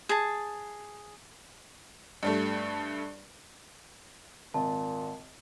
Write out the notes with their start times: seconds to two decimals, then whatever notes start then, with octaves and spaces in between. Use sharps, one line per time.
0.09 G#4 A5
2.23 G2 G3 A3
4.54 G#1 A#2 A5